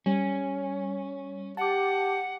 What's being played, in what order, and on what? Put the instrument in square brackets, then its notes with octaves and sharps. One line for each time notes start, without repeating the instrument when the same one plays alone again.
[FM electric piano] G3 [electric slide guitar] C#4
[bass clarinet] G4 [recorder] F#5 [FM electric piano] A5 D6